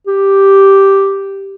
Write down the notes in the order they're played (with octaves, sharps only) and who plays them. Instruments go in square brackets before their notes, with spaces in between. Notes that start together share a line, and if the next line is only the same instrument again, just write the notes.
[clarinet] G4